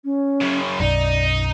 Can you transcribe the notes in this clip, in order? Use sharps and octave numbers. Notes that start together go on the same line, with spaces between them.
C#4
F#2 C#3
B1 F#2 D#4 D5